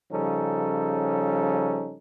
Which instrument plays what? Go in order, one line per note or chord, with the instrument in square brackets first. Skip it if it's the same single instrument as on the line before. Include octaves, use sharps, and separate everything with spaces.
[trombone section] C#3 F3 G3 C#4 D#4 A4